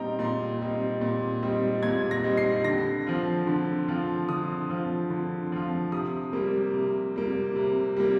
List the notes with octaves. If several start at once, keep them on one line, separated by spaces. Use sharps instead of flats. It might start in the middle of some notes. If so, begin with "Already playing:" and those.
Already playing: A#2 G3 C4 D#4 G5 A#5
A#2 C6
G3 C4 D#4
A#2
G3 C4 D#4
A#2 G#6
A#6
G3 C4 D#4
C7
D3 A#6
F3 C4 F4
D3
F3 C4 F4
D3 D#6
F3 C4 F4
D3
F3 C4 F4
C3 D#6
G3 A#3
C3
G3 A#3
C3
G3 A#3